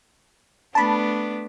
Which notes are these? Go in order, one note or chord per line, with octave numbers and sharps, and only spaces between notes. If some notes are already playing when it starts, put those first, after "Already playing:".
A3 B3 D4 A5 B5